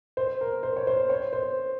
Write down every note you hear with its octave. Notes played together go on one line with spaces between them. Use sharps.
C5
A#4
C5
C#5
C5
C#5
C5